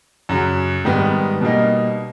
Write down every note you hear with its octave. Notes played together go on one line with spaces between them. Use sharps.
F#2 C#3 F#3
G#2 D#3 G3 B3
B2 G3 A#3 D#4